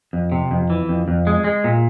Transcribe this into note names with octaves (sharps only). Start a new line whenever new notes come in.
F2
C3
F2
E3
F2
F2
G#3
G#3
A#2